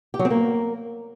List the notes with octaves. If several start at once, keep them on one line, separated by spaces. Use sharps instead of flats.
G4
F#3
C4
A#3